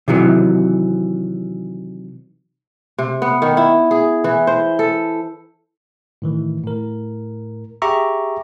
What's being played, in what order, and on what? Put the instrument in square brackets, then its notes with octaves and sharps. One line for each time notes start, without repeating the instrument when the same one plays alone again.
[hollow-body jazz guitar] C3 D#3 E3 F#3
[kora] C3
B3
D#3
E4
G#4
E3
C5
A4
[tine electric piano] A2 D#3 E3
A2 A#4
G4 G#4 E5 A#5 C#6 D6